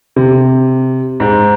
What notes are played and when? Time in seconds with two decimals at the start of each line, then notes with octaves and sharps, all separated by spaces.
0.16 C3
1.20 G#2